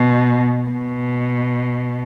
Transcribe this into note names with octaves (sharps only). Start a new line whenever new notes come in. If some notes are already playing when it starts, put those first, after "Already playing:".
Already playing: B2
B2